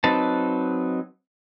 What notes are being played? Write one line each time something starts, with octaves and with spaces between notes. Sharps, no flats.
F#3 C4 D#4 B4 A5